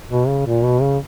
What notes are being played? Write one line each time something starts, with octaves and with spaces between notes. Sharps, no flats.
B2
C#3
A#2
B2
C#3